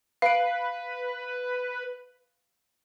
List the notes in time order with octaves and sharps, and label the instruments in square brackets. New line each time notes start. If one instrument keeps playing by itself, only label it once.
[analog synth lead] B4 [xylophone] F5 D7